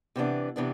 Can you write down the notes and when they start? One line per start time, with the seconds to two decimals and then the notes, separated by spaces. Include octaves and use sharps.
0.16 C3 E3 B3 D4
0.56 C3 E3 B3 D4